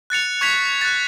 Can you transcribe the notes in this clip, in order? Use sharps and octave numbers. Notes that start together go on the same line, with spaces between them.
F#6 A6 C#7 F7
C#6 G#6 B6 F7
F#6 A6